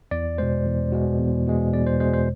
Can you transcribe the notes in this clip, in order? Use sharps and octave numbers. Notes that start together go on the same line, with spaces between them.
E2 D5
B2 G#3 C5
E2
B2 G#3
E2
B2 G#3
E2 D5
C5
B2 G#3 C5
C5